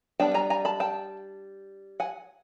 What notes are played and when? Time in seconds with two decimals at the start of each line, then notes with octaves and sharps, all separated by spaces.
0.20 G3 B3 D4 G5 A5
0.34 G#5 A#5
0.50 G#5 A#5
0.65 A5 B5
0.80 G5 A5
2.00 F#5 G#5